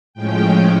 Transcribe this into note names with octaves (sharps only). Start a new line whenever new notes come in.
A2 F3 G#3 C#4 G5